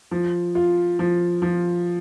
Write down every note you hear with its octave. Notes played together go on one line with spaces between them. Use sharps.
F3
F4
F3
F3